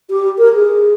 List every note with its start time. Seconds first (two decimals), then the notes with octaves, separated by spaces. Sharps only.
0.10 G4
0.38 A#4
0.53 G#4